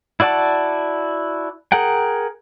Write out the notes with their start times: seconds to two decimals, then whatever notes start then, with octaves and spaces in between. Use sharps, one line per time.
0.20 E4 F#4 D5 F#5 A5
1.72 G#4 A#4 F#5 G5